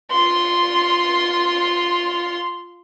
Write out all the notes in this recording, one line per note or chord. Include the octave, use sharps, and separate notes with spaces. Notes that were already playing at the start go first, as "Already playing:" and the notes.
F4 C6